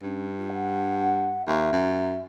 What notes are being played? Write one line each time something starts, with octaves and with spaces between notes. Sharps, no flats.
G2 C#4
F4
F#5
D#2 E5
F#2